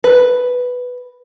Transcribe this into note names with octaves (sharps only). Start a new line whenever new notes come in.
B4